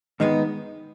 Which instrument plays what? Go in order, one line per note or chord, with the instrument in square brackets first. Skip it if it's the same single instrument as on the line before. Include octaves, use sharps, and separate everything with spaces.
[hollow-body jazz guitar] G#2 D#3 G#3 B3 [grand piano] D#4